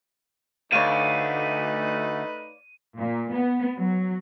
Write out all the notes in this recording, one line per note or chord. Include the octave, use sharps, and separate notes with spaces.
D2 A3 D#4 B4 C#5 D5 F5 D#7
A#2
B3
F#3